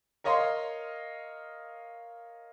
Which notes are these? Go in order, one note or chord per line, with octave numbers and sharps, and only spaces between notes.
A#4 C#5 D#5 F5 C6